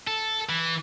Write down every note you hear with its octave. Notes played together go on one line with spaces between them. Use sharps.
A4
E3